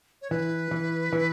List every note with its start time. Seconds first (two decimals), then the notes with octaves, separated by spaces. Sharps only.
0.22 C#5
0.30 E3 B4
0.71 E3
1.13 E3